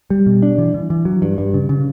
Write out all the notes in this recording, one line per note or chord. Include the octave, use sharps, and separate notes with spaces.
G3
B2
D4
E3
E3
E3
F#3
G2
G2
C#3
C#3